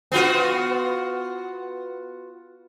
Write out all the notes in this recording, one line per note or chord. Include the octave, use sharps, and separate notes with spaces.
B3 F4 F#4